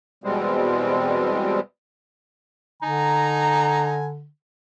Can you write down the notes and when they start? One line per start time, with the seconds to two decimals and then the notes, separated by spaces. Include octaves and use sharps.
0.24 E2 B2 G3 G#3 C4
2.83 D3 D#4 G#5 A#5